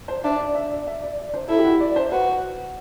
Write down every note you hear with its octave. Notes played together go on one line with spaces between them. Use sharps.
C5
D4 E5
D5
E5
D5
E5
D5
D5
C5
E4 A4
G4
F#4
D5
C5
F#4 B4